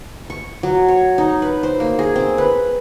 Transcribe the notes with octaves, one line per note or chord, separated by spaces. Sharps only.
C#6
F#3
C#5
D#4
B4
C5
A#3
G#4
C4
B4